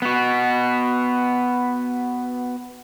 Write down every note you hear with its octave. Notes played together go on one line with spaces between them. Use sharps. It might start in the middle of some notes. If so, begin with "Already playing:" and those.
B3 F#4